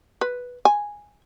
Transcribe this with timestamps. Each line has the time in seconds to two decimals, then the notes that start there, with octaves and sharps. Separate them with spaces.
0.21 B4
0.65 G#5